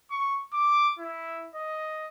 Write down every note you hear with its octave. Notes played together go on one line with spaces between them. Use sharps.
C#6
D6
E4
D#5